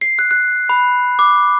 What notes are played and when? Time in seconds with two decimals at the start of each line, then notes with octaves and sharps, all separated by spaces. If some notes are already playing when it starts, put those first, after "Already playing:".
0.01 C7
0.19 F#6
0.31 F#6
0.69 B5
1.19 D6